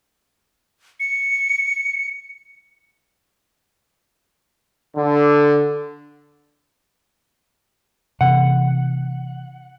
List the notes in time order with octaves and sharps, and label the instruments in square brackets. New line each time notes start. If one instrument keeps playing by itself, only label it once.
[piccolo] C#7
[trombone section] D3
[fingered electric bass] C3 E3 B3 [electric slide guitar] F#5